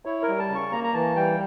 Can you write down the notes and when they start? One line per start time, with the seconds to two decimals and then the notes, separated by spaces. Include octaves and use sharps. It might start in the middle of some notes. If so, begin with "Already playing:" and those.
0.05 E4 C#5
0.22 A#4
0.28 G3
0.39 A5
0.50 C#3
0.56 C#6
0.72 A#3 A#5
0.84 A#5
0.94 E3 A5
1.16 G3 G5